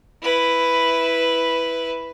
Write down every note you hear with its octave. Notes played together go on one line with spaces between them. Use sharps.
E4 B4